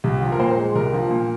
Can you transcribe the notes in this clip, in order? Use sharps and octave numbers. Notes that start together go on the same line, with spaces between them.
C2
F3
A#4
A#2 C5
G#3
C2 A#4
F3
A#2